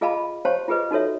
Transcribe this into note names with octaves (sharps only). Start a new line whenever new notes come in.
F4 G#4 D#5 F5 A5 B5
G4 C5 C#5 F5 A5 C6
F4 G4 G#4 B4 D#5
D#4 F#4 A4 C#5 E5